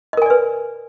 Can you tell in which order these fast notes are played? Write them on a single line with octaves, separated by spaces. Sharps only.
D#5 A#4 G#5 D5 B4